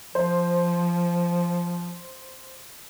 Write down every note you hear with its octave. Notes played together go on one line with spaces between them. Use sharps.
F3 C5